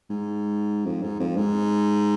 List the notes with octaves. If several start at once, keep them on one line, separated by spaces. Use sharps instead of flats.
G#2
F2
G#2
F2
G#2